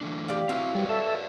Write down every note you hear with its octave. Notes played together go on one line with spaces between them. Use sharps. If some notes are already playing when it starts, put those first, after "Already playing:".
E3 A3 D4
G4 D5 F5
B2 F#3 C4 E4 E5 F5
G3 B4 C#5 D5
A4 E5